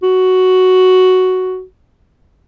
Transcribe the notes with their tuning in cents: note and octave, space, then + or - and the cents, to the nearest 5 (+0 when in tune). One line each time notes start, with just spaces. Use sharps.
F#4 +5